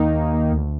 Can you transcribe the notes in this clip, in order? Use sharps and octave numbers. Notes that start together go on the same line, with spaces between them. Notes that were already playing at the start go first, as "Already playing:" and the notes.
Already playing: D#2 D#3 A#3 D#4
D#2
A#3
D2